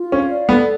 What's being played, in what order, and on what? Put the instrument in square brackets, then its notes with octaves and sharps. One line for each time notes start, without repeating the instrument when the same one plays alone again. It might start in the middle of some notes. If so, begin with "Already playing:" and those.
Already playing: [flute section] F4
[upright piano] C#4 [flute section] F5
[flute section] D5
[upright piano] B3 [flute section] A4